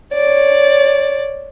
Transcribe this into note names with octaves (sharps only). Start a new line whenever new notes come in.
C#5 D5